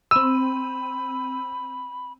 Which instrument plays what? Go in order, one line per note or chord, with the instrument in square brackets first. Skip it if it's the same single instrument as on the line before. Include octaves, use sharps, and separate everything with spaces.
[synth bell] C4 D#7 [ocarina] B5 [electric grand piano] E6